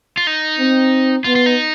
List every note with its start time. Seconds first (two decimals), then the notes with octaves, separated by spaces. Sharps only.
0.17 F4
0.27 D#4
0.59 C4
1.24 B3 F4
1.36 F4
1.46 D#4